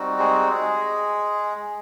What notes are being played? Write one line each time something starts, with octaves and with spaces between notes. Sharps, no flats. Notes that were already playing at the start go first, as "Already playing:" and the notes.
Already playing: G3 C4 D#4 F#4
G#3 G#4